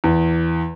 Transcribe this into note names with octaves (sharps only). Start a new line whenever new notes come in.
E2